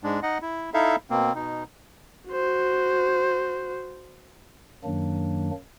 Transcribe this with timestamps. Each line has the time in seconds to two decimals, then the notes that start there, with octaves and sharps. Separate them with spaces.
0.03 G#2 G#3 D4
0.23 D#4 D#5 F#5
0.42 E4
0.74 D#4 E4 A4 E5 F5
1.10 B2 A#3 C4
1.35 B2 D#4
2.30 F#4 C5
4.84 F#2 D#3 F#3 A#3 D4